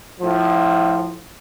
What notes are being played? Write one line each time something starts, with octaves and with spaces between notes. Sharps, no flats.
A2 F3